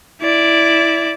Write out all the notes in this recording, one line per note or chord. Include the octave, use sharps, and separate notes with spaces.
E4 D5